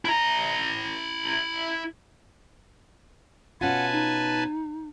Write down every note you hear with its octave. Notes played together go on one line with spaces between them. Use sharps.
E4 A#5
B2 C#4 F4 B4 F#5 G#5 A5
D#4